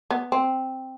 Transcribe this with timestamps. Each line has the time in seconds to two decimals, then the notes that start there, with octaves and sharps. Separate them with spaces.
0.11 B3
0.32 C4